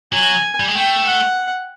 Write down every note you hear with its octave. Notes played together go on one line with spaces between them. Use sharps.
F#3 G#5
G3
G#3
A3 G5
F#5